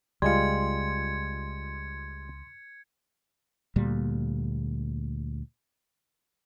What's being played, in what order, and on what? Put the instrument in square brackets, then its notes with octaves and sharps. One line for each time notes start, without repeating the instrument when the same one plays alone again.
[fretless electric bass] C#2 [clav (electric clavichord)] G3 G#3 F4 [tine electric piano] C6 [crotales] G#6 C#7
[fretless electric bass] D2 A#2 G3 A#3